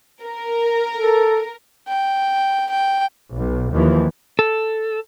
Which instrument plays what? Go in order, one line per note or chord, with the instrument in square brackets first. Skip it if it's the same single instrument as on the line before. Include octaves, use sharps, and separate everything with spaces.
[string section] A#4
[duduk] A4
[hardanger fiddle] G5
G5
[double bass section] B1
D#2 E3 F3
[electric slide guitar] A4